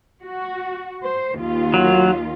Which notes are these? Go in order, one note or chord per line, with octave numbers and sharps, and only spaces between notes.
F#4
C5
D#2 D#3 F4
F#3